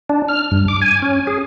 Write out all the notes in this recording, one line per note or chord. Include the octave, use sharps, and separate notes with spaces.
D4
F6
G2
D6
G#5
C#4
G#4